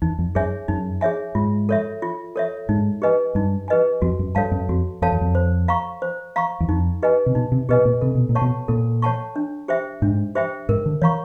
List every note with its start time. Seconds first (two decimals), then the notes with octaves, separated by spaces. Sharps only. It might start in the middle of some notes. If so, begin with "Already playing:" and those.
0.02 E2 D#4
0.18 F2
0.35 F#2 G#4 C#5 E5 G#5
0.68 F#2 D#4
1.01 G#4 C#5 E5 G#5
1.35 G#2 F4
1.69 A4 C#5 E5
2.02 F4
2.36 A4 C#5 E5
2.69 G#2 D#4
3.02 G4 B4 D#5 G#5
3.35 G2 D#4
3.68 G4 B4 D#5 G#5
4.02 F2 F#4
4.19 F#2
4.35 G2 A4 C#5 F5 A5
4.51 F#2
4.69 F2 F#4
5.02 F2 A4 C#5 F5 A5
5.11 E2
5.21 F2
5.35 C5
5.68 F5 A#5 C#6
6.02 C5
6.36 F5 A#5 C#6
6.60 E2
6.69 F2 D#4
7.03 G4 B4 D#5 G#5
7.26 C3
7.35 B2 D#4
7.52 C3
7.69 B2 G4 B4 D#5 G#5
7.85 A#2
8.01 C3 A4
8.15 B2
8.29 A#2
8.35 C#5 F#5 A5 C#6
8.42 B2
8.68 A#2 A4
9.02 C#5 F#5 A5 C#6
9.36 D4
9.68 G4 C5 E5 G5
10.02 G#2 D4
10.35 G4 C5 E5 G5
10.69 G#2 A#4
10.86 D3
11.02 E3 C#5 F5 A#5 C#6